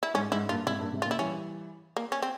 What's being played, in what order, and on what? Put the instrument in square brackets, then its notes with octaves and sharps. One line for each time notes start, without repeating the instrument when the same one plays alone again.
[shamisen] E4
[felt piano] G#2 [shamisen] C#4
[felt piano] G#2 [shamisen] E4
[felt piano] G2 A#2 [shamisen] F4
[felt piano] G#2 C3 [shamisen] E4
[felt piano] G2 A#2
G#2 C3
[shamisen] F4
[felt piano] A#2 C#3
[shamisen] E4
[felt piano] E3 G3 [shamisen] C#4
[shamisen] A#3
C#4
C4